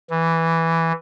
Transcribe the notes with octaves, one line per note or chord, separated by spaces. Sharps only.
E3